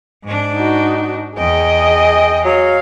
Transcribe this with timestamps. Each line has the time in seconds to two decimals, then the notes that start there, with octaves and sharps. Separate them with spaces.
0.24 G#2 D4
0.53 D#4 F#4
1.38 E2 G#4 D#5 G5
2.45 F#3 F5